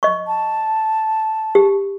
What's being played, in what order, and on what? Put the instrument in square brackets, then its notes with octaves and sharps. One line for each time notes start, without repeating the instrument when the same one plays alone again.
[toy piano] D#5 C#6
[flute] A5
[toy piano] G4